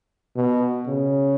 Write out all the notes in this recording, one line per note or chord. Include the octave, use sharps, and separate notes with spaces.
B2
C#3